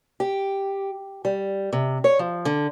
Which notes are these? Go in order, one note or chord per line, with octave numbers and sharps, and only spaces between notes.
G4
G3
C3
C#5
F3
D3